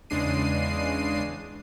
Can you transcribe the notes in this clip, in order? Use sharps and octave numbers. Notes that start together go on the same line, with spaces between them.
E2 C#3 G#3 D4 C7 D#7